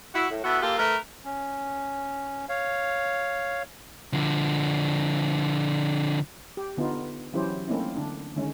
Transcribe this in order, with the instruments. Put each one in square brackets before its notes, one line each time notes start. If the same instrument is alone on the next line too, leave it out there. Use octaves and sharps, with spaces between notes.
[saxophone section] E4 F#4
A2
B3 E4 F#4 A4
A#3 F4 G4 A4
A3 A#4 B4
[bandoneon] C#4
C#5 F5
[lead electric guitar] D3 F3
[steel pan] G4
D3 B3 D#4 F4
E3 F#3 C#4 E4 G4 C5
A3 A#3 C4 C#4 D#4 E4
D3 D4
D3 D#3 G#3 C#4